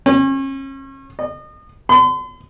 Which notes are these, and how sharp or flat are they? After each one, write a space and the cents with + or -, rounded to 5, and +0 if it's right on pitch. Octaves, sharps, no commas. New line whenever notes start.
C#4 -35
D#5 -35
C6 -45